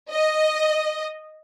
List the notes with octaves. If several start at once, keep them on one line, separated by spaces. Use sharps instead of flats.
D#5